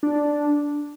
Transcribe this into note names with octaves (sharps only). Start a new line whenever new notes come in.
D4